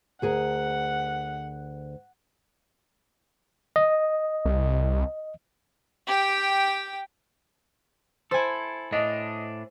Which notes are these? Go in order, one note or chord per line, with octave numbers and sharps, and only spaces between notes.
D2 G#4 A#4 F#5
D#5
C2
G4 G5
E4 A4 C5 G#5
A2 D4 D#5